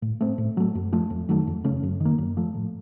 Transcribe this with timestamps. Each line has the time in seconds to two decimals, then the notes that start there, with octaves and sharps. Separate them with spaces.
0.02 A2
0.21 A3 C4
0.38 A2
0.57 F#3 A3
0.75 F#2
0.93 F3 A3
1.10 F2
1.29 D#3 F#3 A3
1.47 F2
1.64 C#3 A3 C#4
1.83 F#2
2.00 D#3 A#3
2.18 F#2
2.37 F3 A3
2.55 A2